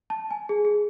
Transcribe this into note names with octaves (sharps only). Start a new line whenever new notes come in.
A5
G#5
G#4
G#4